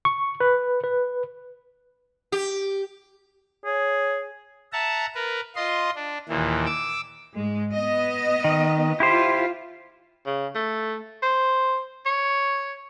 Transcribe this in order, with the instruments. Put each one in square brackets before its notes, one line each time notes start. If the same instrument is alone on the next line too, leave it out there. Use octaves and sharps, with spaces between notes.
[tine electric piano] C#6
B4
B4
[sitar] G4
[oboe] G#4 [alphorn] C#5
[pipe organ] E5 F#5 A5 A#5
A#4 B4
F4 D#5 C6
D4
D#2 A#2 E3
D6 E6
[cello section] G#2 G#3
B3 D#5
[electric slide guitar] D#3
[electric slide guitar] E4 G4 C5 [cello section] F4
[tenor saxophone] C#3
A3
C5
C#5